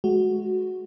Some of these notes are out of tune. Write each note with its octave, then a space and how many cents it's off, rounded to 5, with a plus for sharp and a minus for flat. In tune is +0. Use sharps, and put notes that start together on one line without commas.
G#3 +30 F#4 +0